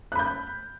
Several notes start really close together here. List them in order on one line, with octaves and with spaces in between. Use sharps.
F#6 B5 G6